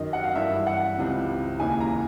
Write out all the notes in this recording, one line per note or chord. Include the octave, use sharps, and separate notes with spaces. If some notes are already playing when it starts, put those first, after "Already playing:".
Already playing: F#2 D#3 D#5
F#5
F5
G2 E3 E5
F#5
C#2 C3 E3
D#2 C#3 E3 G#5
A#5